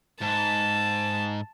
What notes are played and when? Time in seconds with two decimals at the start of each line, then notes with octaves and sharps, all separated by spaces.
0.22 G#2 A5